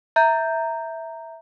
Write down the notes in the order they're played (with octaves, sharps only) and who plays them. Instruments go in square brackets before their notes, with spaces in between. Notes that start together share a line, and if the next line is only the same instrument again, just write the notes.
[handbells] E5 A#5 G6